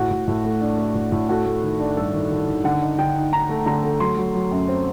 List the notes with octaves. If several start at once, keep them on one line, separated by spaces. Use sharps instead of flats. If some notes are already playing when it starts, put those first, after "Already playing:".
Already playing: A2 F#4
A2
A2
A3
D4
A3
A2
A2
A3 F#4
A3
D#3
D4
G2 A4
D#3
D#3
D#3
D3 F#5
D#4
D3 G5
D#4
D#4 A#5
A3
D3 A#5
A3
F#3 C6
F#3
F#3
F#2
C4